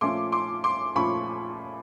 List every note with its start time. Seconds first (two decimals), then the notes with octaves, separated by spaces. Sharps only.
0.01 A#2 F3 A3 C#4 F4 C6 D6
0.32 C6 D6
0.64 C6 D6
0.96 A#2 F3 A3 C#4 F4 B5 C#6